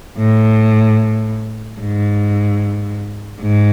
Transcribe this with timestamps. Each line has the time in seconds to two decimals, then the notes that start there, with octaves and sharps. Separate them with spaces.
0.18 A2
1.80 G#2
3.41 G#2